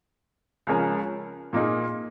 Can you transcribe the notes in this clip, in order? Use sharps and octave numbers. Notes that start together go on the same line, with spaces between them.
C#2 C#3 F3 C#4 A#4
A#2 A#3 D#4 G#4